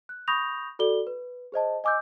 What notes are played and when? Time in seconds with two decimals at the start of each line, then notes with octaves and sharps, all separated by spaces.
0.09 F#6
0.28 B5 C#6 D#6 G6 A#6 F7
0.79 F#4 A4 D5 G7
1.07 B4
1.52 G#4 C5 D#5 A5
1.84 D#5 G#5 D6 E6 G6